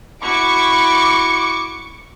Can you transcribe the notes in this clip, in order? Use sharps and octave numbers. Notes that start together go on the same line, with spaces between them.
E4 F#4 C#6 D6